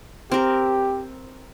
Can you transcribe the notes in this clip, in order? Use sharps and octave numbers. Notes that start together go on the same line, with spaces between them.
C4 G4 A#4